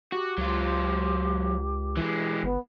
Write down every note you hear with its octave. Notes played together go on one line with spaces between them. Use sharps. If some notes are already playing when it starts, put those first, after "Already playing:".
F#4 G4
C#2 F#3 F4
E3 G#3
G1 B3